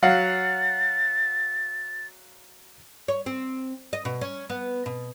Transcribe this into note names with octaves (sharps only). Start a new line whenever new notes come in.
F#3 F5 F#5 A6
C#5
C4
D#5
B2
C#4
B3
B2